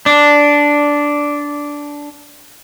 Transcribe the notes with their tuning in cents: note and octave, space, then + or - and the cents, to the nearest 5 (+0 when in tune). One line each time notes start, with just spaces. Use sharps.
D4 -10